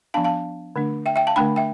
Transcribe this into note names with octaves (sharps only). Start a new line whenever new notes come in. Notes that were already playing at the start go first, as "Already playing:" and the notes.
F3 B3 D4 F5 A5
F5 A5
D3 A3 D4
E5 G5
E5 G5
F5 A5
D3 A3 D4 G5 B5
E5 G5